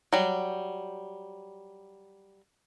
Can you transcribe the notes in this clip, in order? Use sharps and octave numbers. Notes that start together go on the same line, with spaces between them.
F#3 G3